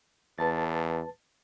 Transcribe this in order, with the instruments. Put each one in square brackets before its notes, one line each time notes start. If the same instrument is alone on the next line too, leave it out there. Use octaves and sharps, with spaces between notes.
[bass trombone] E2 [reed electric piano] B4 A5 A6